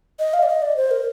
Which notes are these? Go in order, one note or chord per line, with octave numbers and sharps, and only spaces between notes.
D#5
F5
D5
D#5
D5
C5
A#4